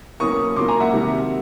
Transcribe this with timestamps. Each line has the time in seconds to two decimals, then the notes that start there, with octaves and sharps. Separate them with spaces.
0.20 B2 F#3 A#3 C#4 C#6 D#6
0.56 A#2 F#3 A#3 C6 D6
0.68 G#5 A#5
0.80 E5 F#5
0.93 C3 D#3 G3